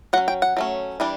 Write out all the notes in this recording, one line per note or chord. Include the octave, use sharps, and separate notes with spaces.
F#3 C#4 F#5
G5
F#5
F#3 A3 C#4
E3 G3 D4